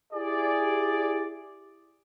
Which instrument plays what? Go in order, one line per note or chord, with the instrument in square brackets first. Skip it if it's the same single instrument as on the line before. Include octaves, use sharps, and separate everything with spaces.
[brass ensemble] E4 G4 G#4 D5